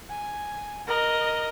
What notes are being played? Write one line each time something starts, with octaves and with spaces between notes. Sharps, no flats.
G#5
A#4 D#5